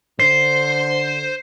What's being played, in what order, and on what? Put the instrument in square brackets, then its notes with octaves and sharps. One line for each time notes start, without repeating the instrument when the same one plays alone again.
[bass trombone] D3 [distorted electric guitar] C5 [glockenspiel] C7